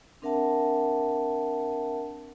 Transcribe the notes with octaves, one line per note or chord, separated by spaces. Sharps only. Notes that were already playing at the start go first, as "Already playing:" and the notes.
C4 D4 A#4 E5 F#5 A5